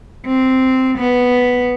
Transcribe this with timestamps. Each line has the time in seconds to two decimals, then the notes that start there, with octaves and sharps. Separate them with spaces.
0.27 C4
0.98 B3